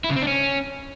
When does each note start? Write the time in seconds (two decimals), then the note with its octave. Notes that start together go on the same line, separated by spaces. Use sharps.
0.04 E4
0.10 C#3
0.16 C4
0.22 D4
0.27 C#4